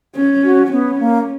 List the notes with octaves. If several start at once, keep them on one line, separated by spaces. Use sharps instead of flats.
C#4
F#4
B3 C#4
A#3